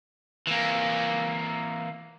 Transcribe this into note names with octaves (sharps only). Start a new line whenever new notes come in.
E3 A#3